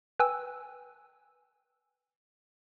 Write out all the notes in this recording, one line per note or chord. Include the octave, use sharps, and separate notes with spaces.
B4 G5 G#5 E6